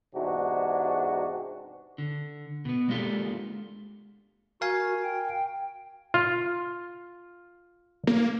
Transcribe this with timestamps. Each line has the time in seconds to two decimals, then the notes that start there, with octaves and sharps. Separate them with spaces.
0.15 E2 G#2 C3 D4 F#4
1.98 D3
2.65 B2 B3
2.89 G#3 A#3 D4 F4 G4 A4
4.61 F#4 A#4 F5 G#5
5.03 G5
6.14 F4
8.07 A#3